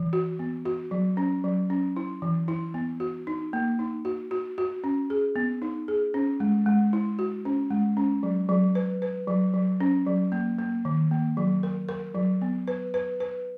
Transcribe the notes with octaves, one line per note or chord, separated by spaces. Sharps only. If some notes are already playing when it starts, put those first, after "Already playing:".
Already playing: E3
F#4
B3
F#4
F#3
C#4
F#3
C#4
E4
E3
E4
B3
F#4
D#4
A#3
D#4
F#4
F#4
F#4
C#4
G#4
B3
D#4
G#4
C#4
G#3
G#3
E4
F#4
C#4
G#3
C#4
F#3
F#3
B4
B4
F#3
F#3
C#4
F#3
A#3
A#3
D#3
A#3
F#3
A#4
A#4
F#3
B3
B4
B4
B4